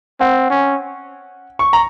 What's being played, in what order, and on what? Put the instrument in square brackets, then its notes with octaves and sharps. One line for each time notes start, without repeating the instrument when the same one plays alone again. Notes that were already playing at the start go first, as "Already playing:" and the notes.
[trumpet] C4 [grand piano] F#5
[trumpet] C#4
[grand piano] C#6
A#5